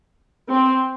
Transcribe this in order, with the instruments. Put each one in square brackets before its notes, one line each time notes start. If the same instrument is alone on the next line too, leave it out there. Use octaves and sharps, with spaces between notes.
[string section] C4